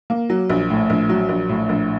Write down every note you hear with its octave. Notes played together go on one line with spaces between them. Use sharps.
A#3
F#3
A#1
A2
A#1
F#3
A#1
A2
A#1